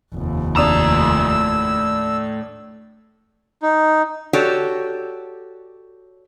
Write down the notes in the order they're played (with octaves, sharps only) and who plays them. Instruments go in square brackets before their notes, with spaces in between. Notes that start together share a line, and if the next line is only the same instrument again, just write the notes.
[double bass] F1 D#2
[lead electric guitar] A2 A#5 [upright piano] D4 D#6 E7 [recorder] E6
[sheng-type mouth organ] D#4
[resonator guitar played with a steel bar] F#4 G4 A4 C#5 D5